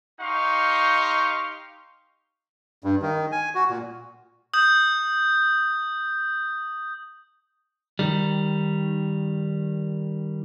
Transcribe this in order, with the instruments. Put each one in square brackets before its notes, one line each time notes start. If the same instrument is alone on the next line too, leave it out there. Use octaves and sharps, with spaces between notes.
[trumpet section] D#4 G4 F5 C6 C#6
[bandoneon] G2
D#3
G#5
F#4
A#2
[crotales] D#6 G6
[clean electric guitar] D#3 G3